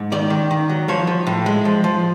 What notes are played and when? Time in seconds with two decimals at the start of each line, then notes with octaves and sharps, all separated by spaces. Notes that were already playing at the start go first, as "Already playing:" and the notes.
Already playing: G#2
0.12 D#3 D5
0.30 D#3
0.51 D#3
0.69 F#3
0.88 F3 C#5
1.07 F3
1.27 A2
1.46 G#3
1.65 F3
1.84 F3